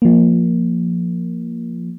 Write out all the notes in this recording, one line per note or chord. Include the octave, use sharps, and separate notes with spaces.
F3 A#3